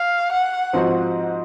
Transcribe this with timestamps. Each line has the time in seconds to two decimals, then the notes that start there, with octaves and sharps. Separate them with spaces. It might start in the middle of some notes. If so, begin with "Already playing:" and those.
Already playing: F5
0.32 F#5
0.73 G#2 F3 C4 F#4 C5